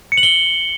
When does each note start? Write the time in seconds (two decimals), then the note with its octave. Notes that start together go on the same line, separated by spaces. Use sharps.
0.12 C#7
0.17 F#7
0.23 G7